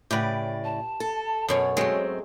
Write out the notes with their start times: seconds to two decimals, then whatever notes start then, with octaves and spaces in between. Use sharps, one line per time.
0.11 A2 C#3 G4 B4 D5
0.64 A5
1.00 A4
1.48 F#2 B2 C#4 C#5
1.77 G#2 F#3 G#3 A3 C4